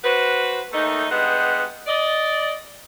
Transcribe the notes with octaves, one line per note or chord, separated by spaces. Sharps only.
F#4 B4 C5
D#2 A3 D#4
G2 G3 G#3 B3 D#5 F#5
D5 D#5